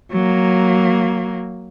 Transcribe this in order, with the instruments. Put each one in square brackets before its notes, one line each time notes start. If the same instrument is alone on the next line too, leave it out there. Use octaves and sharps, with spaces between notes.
[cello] F#3 A#3